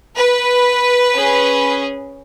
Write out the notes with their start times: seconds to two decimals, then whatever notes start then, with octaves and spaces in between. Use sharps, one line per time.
0.16 B4
1.14 C#4 G#4